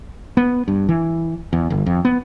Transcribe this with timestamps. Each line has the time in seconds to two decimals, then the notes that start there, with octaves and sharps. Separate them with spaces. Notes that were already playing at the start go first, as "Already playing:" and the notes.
0.37 B3
0.68 G2
0.89 E3
1.53 E2
1.70 G1
1.86 F2
2.05 B3